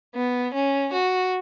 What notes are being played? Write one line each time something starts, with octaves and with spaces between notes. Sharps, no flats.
B3
C#4
F#4